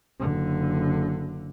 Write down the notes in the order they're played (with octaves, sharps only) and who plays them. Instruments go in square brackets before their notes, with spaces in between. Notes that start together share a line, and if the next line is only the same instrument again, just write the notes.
[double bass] F#1 D3